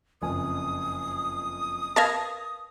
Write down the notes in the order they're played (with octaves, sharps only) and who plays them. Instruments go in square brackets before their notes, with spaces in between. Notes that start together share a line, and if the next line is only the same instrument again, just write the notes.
[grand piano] F#1 F2 G#5 [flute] D#6
[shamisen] A#4 B4 F5 [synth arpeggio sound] A5 G#6 A#6